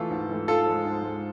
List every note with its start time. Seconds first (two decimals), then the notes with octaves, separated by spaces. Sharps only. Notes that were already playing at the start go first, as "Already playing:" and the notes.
Already playing: E3 A3 F4 A4
0.10 G#2
0.29 E3 A3
0.48 G#2 F4 A4
0.66 F3 G#3
0.85 G#2
1.03 F3 G#3